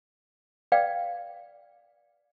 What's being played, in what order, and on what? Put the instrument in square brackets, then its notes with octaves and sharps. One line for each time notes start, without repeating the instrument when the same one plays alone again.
[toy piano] B4 D5 F5 G5